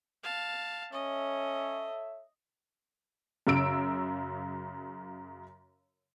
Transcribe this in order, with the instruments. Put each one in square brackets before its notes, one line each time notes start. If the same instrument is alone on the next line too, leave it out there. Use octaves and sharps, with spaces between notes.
[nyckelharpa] F5 A5
[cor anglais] C#4 [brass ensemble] A4 C#5 E5 [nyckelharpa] D#5
[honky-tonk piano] F#2 C#3 E6 D7